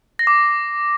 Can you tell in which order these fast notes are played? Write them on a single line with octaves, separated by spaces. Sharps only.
A#6 C7 D6